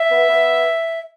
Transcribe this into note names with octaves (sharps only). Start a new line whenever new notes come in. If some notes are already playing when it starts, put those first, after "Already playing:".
Already playing: E5
B3
B3